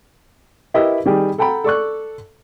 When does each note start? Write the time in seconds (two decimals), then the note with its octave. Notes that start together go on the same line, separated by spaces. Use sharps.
0.74 E4 G4 A#4 B4 D#5 E5
1.06 D#3 G3 G4 G#4
1.38 A4 F#5 G5 A#5 B5
1.64 A4 D5 C#6 F#6